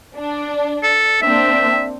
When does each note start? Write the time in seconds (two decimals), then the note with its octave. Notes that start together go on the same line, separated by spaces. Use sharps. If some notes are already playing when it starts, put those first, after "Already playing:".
0.17 D4
0.83 A4
1.22 A#3 C4 D4 E5